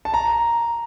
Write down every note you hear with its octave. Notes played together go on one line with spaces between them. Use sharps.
A5
A#5